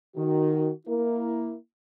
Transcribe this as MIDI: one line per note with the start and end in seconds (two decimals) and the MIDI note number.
0.16 0.70 51
0.16 0.70 66
0.87 1.55 58
0.87 1.55 64
0.87 1.55 70